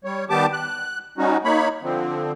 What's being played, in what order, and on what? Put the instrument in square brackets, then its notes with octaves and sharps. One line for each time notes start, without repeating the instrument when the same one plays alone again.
[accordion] G3 C#5
D#3 G3 B3 G4 A5 D6
F#6
G3 C#4 D#4 F#4
A#3 D#4 C#5 B5
D3 F3 C4